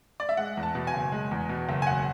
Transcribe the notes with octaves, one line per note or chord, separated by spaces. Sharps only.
D5
E5
G#3 F#5
E2
A5
B2
G#5
F#1
G#3
E2
B2
F#1
G#5
E1 F#5